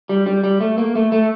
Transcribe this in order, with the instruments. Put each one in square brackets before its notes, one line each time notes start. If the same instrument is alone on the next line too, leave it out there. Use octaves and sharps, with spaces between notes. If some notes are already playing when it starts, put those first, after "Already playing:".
[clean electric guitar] G3
G3
G3
A3
A#3
A3
A3